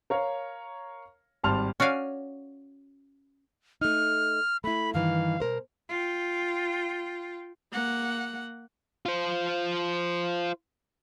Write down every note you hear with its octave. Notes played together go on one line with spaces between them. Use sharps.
A#4 C#5 F5
G#1 G3 A5 C6 F6 F7
C#4 F#4 D5 F5 G#5
A3 D#4 F6
A3 E4 B5
G2 D#3 E3 F5
B2 A#4 C5
F4 G5
A#3 F#5
F4 C5